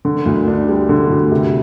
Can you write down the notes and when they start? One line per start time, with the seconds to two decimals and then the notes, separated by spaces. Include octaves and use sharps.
0.05 D3
0.26 D2
0.47 D4
0.69 G3
0.89 D3
1.10 D2
1.32 C3